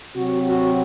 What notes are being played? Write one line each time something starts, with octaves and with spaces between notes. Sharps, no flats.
C3 F#3 C4 F#4
F#4